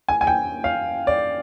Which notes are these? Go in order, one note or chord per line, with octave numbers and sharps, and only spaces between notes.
G#5
G#5
G5
F5
D5